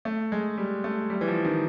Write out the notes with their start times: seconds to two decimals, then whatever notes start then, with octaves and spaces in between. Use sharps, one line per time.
0.05 A3
0.32 G#3
0.58 G3
0.84 A3
1.10 G3
1.21 E3
1.28 F3
1.45 D#3